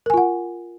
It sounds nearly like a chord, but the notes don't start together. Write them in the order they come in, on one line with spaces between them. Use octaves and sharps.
A#4 G#5 F4 F#5